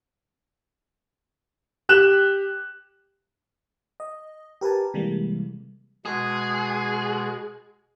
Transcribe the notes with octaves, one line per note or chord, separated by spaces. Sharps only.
G4 F#6 E7
D#5
G4 A#4 B4 G#5 A5
C3 E3 G3 G#3 A#3
B2 G#3 G#4